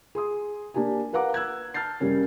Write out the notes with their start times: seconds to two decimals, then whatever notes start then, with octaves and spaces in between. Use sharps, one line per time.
0.15 G#4 C6 D#6
0.74 A#3 D4 G4 A#4 G#5
1.13 A#4 B4 F5 F#5 A#5 D6
1.34 E6 F#6 G#6
1.74 A5 F6 G6 A6 C7
2.00 F#1 C#3 G3 C#4 A#4